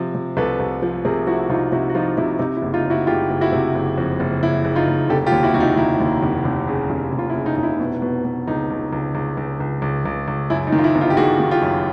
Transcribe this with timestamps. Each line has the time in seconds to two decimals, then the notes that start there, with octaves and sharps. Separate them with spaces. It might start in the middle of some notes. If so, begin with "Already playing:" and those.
Already playing: C3 F3
0.15 C3
0.37 C2 A4 B4
0.60 C2
0.82 F3
1.05 C3 G#4 A#4
1.27 F3 E4 F#4
1.50 C2 D#4 F4
1.72 C3 E4 F#4
1.90 F#4
1.94 F3 D#4 F4
2.17 C3 E4
2.39 C3 D#4
2.56 E4
2.62 F#1
2.74 D#4 F4
2.85 F#1
2.90 E4 F#4
3.07 F#1 F4 G4
3.30 F#1
3.41 E4 F#4
3.52 C3
3.75 F#1
3.97 F2
4.20 F#1
4.43 F#1 E4
4.65 F#1
4.76 D#4 F4
4.87 F#1
5.10 F1 G4 A4
5.27 F4 G4
5.32 D#2
5.43 E4 F#4
5.54 F1 F#4
5.60 D#4 F4
5.77 D#2 E4
6.00 D#2
6.23 F1
6.45 F1
6.68 C#3
6.90 F1
7.13 F1
7.19 F4
7.30 E4
7.35 C#3
7.46 D#4
7.56 F1 D#4
7.63 E4
7.80 B2
8.02 B2
8.25 B2
8.47 C#2 D#4
8.70 C#2
8.93 C#2
9.15 C#2
9.37 C#2
9.60 C#2
9.82 C#2
10.05 C#2
10.28 C#2
10.50 F#2 E4
10.67 D#4
10.72 D#3
10.79 F4
10.84 E4
10.95 G1
11.01 D#4 F4
11.10 G4
11.17 D#3 F#4 G#4
11.40 D#3
11.51 F4 G4
11.62 F#2